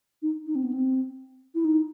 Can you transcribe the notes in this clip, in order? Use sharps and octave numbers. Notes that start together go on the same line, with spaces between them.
D#4
D#4
C4
B3
C4
E4
D#4